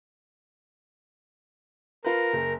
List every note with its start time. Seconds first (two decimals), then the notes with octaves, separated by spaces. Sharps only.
2.04 F4 A#4 B4
2.33 F#1